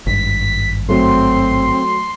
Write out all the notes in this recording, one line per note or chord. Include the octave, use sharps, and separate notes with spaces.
G#1 G2 B6
F#3 A3 C4 F#4 C6